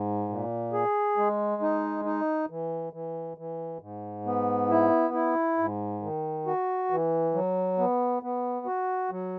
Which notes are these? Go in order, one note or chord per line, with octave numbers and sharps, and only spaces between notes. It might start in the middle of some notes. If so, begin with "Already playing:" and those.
Already playing: G#2
A#2
G#4
G#3
D#4
D#4
E3
E3
E3
G#2
B3
E4
E4
G#2
D#3
F#4
E3
F#3
B3
B3
F#4
F#3